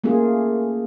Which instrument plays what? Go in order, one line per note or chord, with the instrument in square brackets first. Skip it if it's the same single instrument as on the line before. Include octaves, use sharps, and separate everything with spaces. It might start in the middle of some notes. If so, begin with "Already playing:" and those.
[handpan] A3 A#3 C#4 F4 G#4